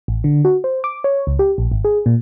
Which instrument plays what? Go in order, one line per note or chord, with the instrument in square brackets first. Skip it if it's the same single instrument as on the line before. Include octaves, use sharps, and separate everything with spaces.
[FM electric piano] A1
D3
F#4
C5
D6
C#5
C#2
G4
A#1
G#1
G#4
A#2